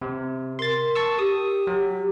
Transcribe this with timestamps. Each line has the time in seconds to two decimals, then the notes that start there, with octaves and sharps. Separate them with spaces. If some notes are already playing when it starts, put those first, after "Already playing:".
0.02 C3
0.59 A#4 C6 A6
0.95 A5 C#6 E6
1.19 G4 D#6
1.67 F#3